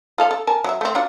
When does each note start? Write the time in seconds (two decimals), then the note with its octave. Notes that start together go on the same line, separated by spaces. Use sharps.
0.18 F4 A4 F5
0.31 A4
0.47 A#4 G#5 A5
0.64 F#3 E5
0.81 A3 C4
0.95 D4 F4 F#4